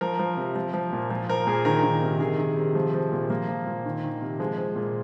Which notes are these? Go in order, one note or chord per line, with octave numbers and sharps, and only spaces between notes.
F3 A#4
F3
C3
F3
F3
A#2
F3
F3 A#4
A#2 G#4
D#3 A#4
D#3
C3
D#3 G#4
D#3
C3
F3
F3
A#2
F3 A#3
F3
A#2
D#3
D#3
C3
F3 G#3
F3
A#2